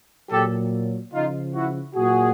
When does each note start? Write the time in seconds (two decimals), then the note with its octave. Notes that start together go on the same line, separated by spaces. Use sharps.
0.31 A#2 F#3 G4 A4
1.13 C#3 F3 D#4 F4
1.54 E4 F#4
1.95 A#2 F#3 F#4 G#4